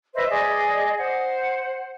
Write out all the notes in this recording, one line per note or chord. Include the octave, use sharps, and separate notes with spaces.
B4 C5 D#5 E5
G#4 D5 D#5
C5 F#5